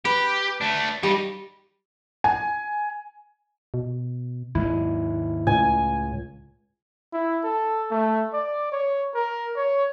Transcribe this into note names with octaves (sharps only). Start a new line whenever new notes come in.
G4 B4
A3 D4
G3 D#4 G4
G#5
B2
D#2 G#2 G#3 E4
C#2 A2 G#5
E4
A4
A3
D5
C#5
A#4
C#5